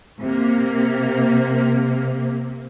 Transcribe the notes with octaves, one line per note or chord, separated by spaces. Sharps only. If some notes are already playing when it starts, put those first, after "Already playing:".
C3 A#3